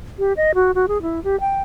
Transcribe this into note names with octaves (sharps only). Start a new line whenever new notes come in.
G4
D#5
F#4
F#4
G#4
E4
G4
G5